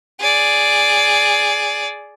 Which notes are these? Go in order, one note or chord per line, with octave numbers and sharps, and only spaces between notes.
G#4 D5